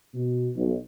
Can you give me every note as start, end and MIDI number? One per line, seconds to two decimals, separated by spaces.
0.14 0.49 47
0.55 0.75 35